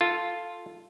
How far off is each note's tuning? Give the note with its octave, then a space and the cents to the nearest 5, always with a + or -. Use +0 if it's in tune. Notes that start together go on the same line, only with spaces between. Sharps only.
F4 +0 A4 +0